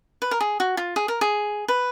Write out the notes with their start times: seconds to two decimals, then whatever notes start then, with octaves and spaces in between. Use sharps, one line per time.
0.22 B4
0.31 A#4
0.41 G#4
0.60 F#4
0.77 F4
0.96 G#4
1.08 A#4
1.21 G#4
1.68 B4